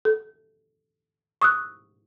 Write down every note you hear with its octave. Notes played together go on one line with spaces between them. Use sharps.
A4
C#6 D#6 E6 F#6